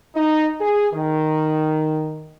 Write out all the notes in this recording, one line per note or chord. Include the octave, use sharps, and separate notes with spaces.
D#4
G#4
D#3